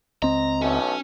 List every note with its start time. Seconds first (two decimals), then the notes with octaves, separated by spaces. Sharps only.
0.22 C#2 C4 D#5 A#5
0.62 B1 A2 A3 C#4